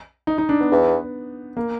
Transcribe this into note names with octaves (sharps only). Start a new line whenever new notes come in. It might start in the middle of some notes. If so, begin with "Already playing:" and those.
D#4
D#4
D4
B3
E2
A#3